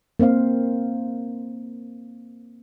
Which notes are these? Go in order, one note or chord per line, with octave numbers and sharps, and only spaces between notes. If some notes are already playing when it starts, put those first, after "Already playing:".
A#3 C4 C5 F5